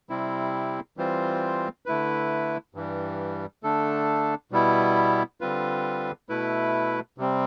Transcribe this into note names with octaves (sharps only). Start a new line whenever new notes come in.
C3 G3 C4 E4
E3 G3 C4 F4 C5
D3 A3 E4 B4
G2 E3 G3
D3 A3 D4 A4
B2 G3 B3 E4
D3 G3 C4 F4 B4
B2 A3 E4 B4
C3 G3 C4